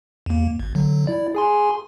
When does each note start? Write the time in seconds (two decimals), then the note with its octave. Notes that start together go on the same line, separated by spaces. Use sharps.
0.26 E2 A#3
0.60 G#1
0.75 D3 F#3
1.07 E4 D5
1.35 G#4 G#5 C6